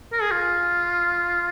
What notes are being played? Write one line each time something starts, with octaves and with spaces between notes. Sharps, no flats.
A#4
G#4
F4